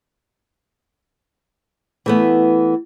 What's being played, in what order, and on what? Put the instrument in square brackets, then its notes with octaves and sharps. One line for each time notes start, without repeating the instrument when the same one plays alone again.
[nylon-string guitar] E3 A3 B3